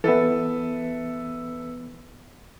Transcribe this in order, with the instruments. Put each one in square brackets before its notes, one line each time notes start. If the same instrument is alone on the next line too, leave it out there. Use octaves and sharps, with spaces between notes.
[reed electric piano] E3 B3 [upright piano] A4 B4 E5